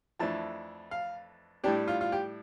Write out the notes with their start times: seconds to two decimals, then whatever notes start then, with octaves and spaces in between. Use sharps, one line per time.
0.19 F2 E3 A3 D4 A5
0.91 F5
1.64 A2 G3 D4 G4
1.88 F4
2.01 F4
2.12 G4